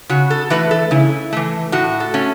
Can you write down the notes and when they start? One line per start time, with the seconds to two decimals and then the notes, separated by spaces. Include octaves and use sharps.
0.09 C#3 F#4
0.30 A4
0.50 E3 A3 B4
0.71 A4
0.91 C#3 E4
1.33 E3 A3
1.72 A2 F#4
2.00 A4
2.14 A3 C#4